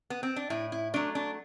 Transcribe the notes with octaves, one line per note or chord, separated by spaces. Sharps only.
B3
C4
D4
A2 E4
E4
F#3 A3 D4
D4